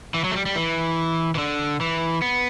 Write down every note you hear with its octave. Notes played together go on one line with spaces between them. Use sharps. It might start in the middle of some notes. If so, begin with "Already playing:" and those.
E3
F#3
A3
G3
G3
E3
E3
D3
E3
B3